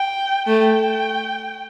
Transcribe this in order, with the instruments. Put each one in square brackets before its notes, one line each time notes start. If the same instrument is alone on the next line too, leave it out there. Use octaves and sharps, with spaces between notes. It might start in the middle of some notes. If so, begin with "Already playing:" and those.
Already playing: [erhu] G5
[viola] A3 [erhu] G5